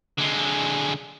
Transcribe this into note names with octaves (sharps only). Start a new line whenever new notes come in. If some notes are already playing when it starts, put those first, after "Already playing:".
D3 G#3